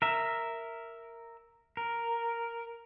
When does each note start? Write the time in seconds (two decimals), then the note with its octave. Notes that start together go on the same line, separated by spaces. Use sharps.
0.02 A#4 E5
1.77 A#4